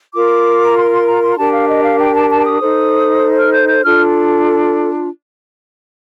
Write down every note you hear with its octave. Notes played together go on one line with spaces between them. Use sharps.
F4 A#4 D6
A#5
C6
C6
A#5
C6
A#5
D4 G4 A#4 A5
F5
D#5
F5
G5
A5
A5
D#6
D#4 A4 C5
F6
G6
G6
D4 F4 A4 F6